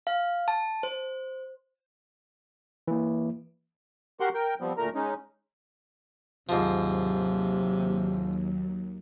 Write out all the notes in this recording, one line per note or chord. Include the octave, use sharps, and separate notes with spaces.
F5
A5
C5
E3 A#3
F#4 G4 A#4 F#5 C6
A#4 G5
F3 G3 B3 C4
D2 A#2 A3 A#4 A#5
G#3 C#4 D#4
D#2 G#2 C3 F3 F#3